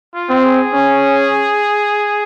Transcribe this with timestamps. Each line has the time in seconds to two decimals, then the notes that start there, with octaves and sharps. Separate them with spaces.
0.14 F4
0.30 C4
0.44 G#4
0.74 C#4